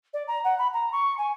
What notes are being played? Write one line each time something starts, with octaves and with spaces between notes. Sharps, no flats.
D5
A#5
F#5
B5
A#5
C#6
G#5